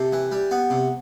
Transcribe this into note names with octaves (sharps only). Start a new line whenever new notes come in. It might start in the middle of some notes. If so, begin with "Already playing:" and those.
Already playing: C3 G4 A4
E3
G3
B3
C3